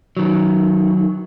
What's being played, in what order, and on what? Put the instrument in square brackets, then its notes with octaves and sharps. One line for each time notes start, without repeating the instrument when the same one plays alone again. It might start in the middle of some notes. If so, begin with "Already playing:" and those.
[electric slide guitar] D#3 F#3